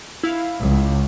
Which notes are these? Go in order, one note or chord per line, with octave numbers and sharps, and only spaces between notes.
E4 F5
C#2